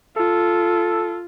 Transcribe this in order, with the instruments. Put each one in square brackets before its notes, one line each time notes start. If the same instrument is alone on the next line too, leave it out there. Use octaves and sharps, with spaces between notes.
[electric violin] F4 [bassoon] A4